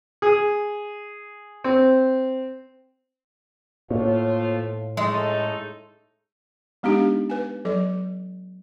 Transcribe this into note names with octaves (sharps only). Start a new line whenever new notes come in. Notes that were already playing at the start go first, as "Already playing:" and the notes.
G#4
C4
A2 F3 A3 A#3 F4 C#5
G#3 C#4 D#4 A4 E5
G#3 B3 D4 D#4 G4
B4 G#5
F#3 A4 D#5